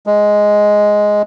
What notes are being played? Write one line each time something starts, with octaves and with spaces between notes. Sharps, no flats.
G#3